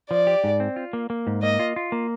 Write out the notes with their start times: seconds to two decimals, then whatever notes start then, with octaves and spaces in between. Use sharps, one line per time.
0.10 F3 D5
0.27 G4
0.44 G#2
0.60 C4
0.76 F4
0.93 A#3
1.10 A#3
1.27 G#2
1.43 A#3 D#5
1.59 F4
1.76 F4
1.92 A#3